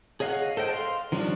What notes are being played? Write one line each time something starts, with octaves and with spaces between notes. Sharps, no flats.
G#4 C#5 D#5 F5 F#5
A4 C5 D#5 G5
F5 C6
D#3 F3 G3 C#4 D4